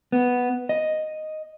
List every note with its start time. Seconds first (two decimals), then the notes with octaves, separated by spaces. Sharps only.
0.12 B3
0.69 D#5